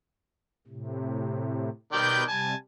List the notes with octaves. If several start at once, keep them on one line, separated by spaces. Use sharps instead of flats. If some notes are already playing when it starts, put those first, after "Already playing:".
A2 C3
B2 D#3 B4 D5 G5 G6
C3 G3 G#5 A5